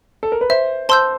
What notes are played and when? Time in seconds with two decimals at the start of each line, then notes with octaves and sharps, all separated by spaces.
0.23 A4
0.32 A#4
0.41 B4
0.50 C5 E5
0.89 C5 A5 C6 E6 G6